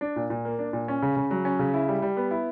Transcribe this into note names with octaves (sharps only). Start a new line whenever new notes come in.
D4
A#2
A#2
A#3
D4
A#2
C#4
C#3
C#3
F#3
C#4
C#3
E4
G3
G3
B3
E4